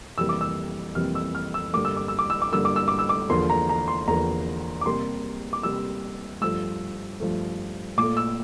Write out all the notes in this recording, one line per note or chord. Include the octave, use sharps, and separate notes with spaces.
F2 C3 E3 G3 A#3 E6
D6
E6
F2 C3 E3 G3 A#3 F6
E6
F6
E6
G2 D3 G3 A#3 D6
E6
D6
E6
D6
E6
D6
G2 D3 G3 A#3 E6
D6
E6
D6
E6
D6
E2 D3 F3 A#3 C6
A#5
A#5
C6
E2 D3 F3 A#3 A#5
D6
C3 G3 A#3 C6
D6
C3 G3 A#3 E6
G2 F3 A3 E6
G2 F3 A3
A#2 A3 D6
E6